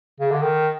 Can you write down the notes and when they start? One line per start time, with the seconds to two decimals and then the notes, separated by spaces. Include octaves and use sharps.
0.20 C#3
0.31 D3
0.42 D#3